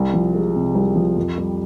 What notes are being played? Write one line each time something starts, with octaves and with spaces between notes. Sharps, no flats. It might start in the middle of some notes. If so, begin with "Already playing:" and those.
Already playing: C2
F3
G#3
C3
C2
F3
F2
G3